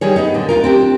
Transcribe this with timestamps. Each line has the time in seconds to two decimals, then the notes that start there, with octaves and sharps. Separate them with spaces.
0.01 D#3 G3 G#4 C#5
0.16 B3 D#4
0.34 A#2 D3
0.49 D2 F4 A#4
0.64 C4 D4 G4